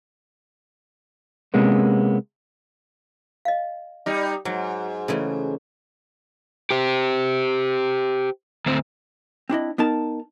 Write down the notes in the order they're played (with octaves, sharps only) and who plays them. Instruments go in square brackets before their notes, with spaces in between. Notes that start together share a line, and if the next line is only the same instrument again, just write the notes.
[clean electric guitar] C3 G#3 A#3 B3 C#4
[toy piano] D#5 F5
[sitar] G3 D#4
[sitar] G#2 [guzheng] F#3
[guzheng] C#3 E3 A3
[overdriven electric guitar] G4 C5
D2 C4
[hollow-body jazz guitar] C4 D4 E4 D#5
B3 D#4 A#4 A5